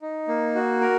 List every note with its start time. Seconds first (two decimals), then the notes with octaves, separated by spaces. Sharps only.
0.02 D#4
0.28 A#3
0.55 F#4
0.81 A#4